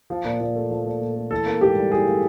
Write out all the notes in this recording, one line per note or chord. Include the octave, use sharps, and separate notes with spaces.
F3
A#2
A#2
A3
F3
A#2
A#2
A3
E3 A4
A#3
G#2 G4
G3
E3 G#4
A#3